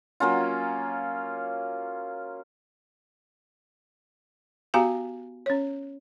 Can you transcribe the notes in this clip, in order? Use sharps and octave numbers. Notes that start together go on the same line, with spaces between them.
F#3 A#3 C#4 F4
B3 F#4 G4 F5 G#5 A#5
C#4 C#5